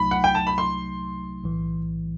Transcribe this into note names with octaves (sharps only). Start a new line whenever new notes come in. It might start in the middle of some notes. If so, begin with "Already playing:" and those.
Already playing: C2 C3 F#3 A3 D#4 B5
F#5
G5
A5
B5
C6
B1 A2 E3